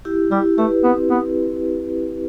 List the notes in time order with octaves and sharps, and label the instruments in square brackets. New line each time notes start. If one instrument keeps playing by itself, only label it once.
[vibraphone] E4 G4
[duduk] G3 [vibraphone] E4 G4
[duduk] A3 [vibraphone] G4 B4
[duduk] B3 [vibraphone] C4
[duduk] B3